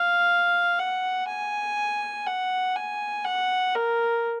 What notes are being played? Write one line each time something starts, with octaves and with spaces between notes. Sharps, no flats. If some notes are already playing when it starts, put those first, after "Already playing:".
Already playing: F5
F#5
G#5
F#5
G#5
F#5
A#4